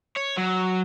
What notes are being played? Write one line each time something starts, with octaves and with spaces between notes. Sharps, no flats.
C#5
F#3